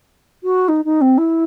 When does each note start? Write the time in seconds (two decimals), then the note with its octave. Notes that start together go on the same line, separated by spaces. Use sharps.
0.43 F#4
0.68 D#4
0.85 D#4
1.01 C4
1.18 E4